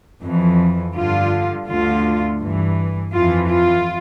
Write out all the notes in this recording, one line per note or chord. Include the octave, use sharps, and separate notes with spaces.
F2 E3
G2 D3 F4
D2 D3 F4
G2 E3
F2 E3 F4
F4